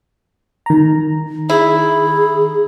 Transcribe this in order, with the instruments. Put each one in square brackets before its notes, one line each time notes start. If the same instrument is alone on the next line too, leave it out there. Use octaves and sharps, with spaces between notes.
[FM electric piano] D#3 A#5
[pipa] E4 [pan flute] G#4